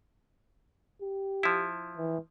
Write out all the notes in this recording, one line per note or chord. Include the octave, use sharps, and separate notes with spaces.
G4
F3 E4
E3